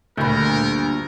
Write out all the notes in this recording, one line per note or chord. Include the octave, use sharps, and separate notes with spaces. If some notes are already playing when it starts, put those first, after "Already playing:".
D2 G2 A#2 A3 A#4 B5